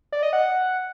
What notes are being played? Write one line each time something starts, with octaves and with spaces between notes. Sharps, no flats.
D5
D#5
F#5